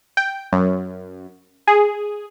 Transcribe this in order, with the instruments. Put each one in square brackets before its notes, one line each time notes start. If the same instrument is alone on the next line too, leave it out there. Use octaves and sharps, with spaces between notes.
[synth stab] G5
F#2
G#4